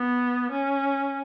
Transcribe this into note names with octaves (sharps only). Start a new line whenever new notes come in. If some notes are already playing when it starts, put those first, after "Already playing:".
Already playing: B3
C#4